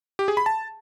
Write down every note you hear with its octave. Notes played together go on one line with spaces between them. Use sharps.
G4
G#4
B5
A5